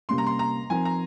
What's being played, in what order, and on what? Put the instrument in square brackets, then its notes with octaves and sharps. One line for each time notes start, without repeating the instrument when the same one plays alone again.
[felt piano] C3 G3 A#3 C#4 [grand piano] C6
[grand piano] A#5
C6
A#5
[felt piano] F3 C4 D#4 A#4 [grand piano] G#5
[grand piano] A#5